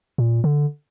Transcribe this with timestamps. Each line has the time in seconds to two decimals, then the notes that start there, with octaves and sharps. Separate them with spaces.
0.18 A#2
0.44 D3